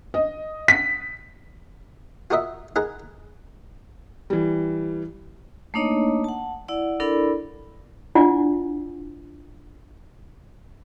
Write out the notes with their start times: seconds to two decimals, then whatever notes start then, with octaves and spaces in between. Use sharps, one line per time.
0.14 D#5
0.68 B6
2.31 F4 F#4 A#4 D#5 E5
2.76 D#4 G#4 A#4 F#5 A#5
4.30 E3 G3
5.74 A3 A#3 D4 D#4 C#5 D#5
6.24 F#5 A5
6.68 E4 D5 F#5
7.00 D4 E4 A4 A#4 D5 B5
8.15 D4 E4 F4 D5 F#5 G#5